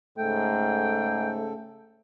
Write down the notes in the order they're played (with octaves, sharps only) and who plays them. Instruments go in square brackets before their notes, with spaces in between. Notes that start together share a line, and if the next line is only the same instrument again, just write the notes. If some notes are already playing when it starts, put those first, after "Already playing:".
[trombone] G#2 [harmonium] C#3 A4 [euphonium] A3 [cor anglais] G5